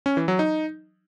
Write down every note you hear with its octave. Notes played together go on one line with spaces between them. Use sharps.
C#4
E3
F#3
D#4